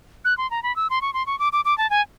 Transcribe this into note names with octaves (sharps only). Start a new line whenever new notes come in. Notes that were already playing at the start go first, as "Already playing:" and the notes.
F#6
C6
A#5
B5
E6
C6
C#6
C6
C#6
D6
D6
D6
A5
G#5